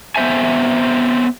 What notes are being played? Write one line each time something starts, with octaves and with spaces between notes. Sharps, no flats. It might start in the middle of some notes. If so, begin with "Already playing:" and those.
B3 C4 C5 E5 G#5